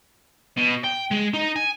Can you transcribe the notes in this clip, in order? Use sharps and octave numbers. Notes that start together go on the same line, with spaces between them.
B2
G5
G#3 G#4
D#4
G#5